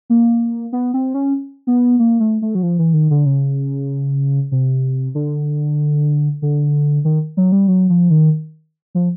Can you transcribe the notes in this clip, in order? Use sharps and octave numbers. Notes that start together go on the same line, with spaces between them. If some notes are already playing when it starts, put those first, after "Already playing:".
A#3
B3
C4
C#4
B3
A#3
A3
A3
F#3
F3
E3
D#3
D3
C#3
C3
D3
D3
D#3
F#3
G3
F#3
F3
D#3
F3